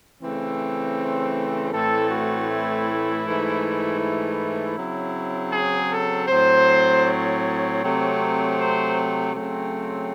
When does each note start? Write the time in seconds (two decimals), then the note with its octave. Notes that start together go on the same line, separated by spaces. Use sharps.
0.19 C#3 E3 A3 C4
1.71 A2 E3 A3 C4 A4
2.10 F#4
2.48 E4
3.23 G#2 E3 A3
3.99 E4
4.75 C#3 F#3 C4
5.52 G#4
5.90 A4
6.28 A2 F#3 C4 C5
7.04 C#5
7.81 C3 F#3 A3 C4
8.58 C5
9.33 C#3 F#3 A3 C4